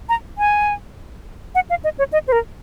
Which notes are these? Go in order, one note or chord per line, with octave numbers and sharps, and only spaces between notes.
A#5
G#5
F#5
F5
D#5
C#5
D#5
C5
A#4